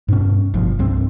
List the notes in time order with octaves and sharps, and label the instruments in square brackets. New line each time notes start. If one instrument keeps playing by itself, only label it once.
[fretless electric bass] G2 B2 C#4
G1 G2 F3
C2 G2 C4